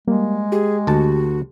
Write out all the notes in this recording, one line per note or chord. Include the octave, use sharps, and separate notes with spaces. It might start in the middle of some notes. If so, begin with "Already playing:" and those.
G3 G#3 A#3
G4 G#4
D2 F#4 A5